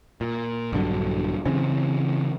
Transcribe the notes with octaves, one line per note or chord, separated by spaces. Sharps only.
A#2
A#1 G2 D3 F#3
C#3 E3 C4 C#4